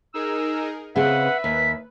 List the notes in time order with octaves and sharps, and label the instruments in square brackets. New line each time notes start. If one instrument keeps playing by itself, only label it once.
[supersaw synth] D#4 G#4 A#4 [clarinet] E6
[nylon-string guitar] C#3 C4 G#4 [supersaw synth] B4 [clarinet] E5 [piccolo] F#5
[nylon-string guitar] D#2 [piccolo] B6